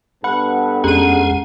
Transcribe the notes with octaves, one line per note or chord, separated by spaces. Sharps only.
G2 B3 A4 F#5 B5
F2 G#3 C#4 G#4 F#5 D#7